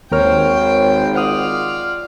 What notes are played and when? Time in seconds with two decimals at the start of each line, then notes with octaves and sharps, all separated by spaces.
0.12 G#1 D#2 A#4 C5 C#5 G5 F6
1.15 F4 D5 F#5 D#6 F6